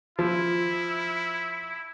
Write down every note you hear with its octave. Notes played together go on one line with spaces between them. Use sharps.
F3 E4